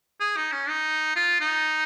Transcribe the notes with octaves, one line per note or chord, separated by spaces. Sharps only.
G#4
D#4
C#4
D#4
F4
D#4